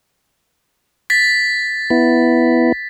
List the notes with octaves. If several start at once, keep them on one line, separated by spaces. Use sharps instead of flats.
A6 B6
B3 E4